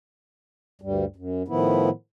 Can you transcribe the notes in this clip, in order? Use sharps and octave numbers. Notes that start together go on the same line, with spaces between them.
D2 G2 G3
F#2
A2 D#3 F3 B3 E4